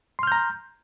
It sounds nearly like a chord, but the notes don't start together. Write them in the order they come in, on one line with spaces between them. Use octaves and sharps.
C6 F6 G6 A#5